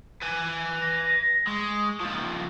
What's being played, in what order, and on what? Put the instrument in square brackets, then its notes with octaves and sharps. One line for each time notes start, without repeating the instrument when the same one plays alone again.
[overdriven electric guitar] B4 G#5
[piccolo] A#6
[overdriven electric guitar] G#3 [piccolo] C#6
[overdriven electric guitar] D#2 F3